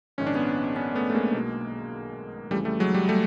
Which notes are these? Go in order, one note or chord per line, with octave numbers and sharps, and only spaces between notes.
A#1 G#2 D#3 C#4
D4
B3 C#4
B3 C#4
A3 B3
A3
G#3 A#3
B1 B2
F2 C#3 E3 G3 A3
G3 A3
F#3 G#3
G3
G3 A3